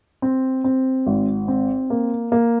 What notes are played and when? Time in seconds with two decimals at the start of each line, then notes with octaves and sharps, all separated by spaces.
0.22 C4
0.64 C4
1.07 G#1
1.48 C4
1.90 A#3
2.32 A#3